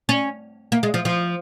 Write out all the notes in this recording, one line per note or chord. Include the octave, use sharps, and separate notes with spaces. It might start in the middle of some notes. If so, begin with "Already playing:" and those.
C#4
A#3
G#3
F3
F3